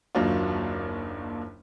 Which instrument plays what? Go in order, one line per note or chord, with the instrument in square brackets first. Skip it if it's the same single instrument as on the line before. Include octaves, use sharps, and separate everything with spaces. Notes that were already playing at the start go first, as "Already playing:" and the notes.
[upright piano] F#1 D#2 F#3 D4 F4